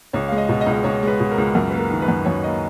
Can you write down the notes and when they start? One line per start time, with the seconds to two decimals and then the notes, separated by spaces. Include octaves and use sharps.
0.13 C#2 C#5
0.28 F5
0.32 G#3
0.38 D#5
0.49 B2
0.61 D#5
0.66 C#2
0.73 D#5
0.84 C#2 C#5
1.03 G#3 B4
1.20 B2
1.31 A#4
1.38 C#2
1.55 F#2 A#4
1.70 A#3 B4
1.79 A#4
1.91 D#3
2.02 B4
2.08 F#2
2.25 F#2 C#5
2.44 A#3 D#5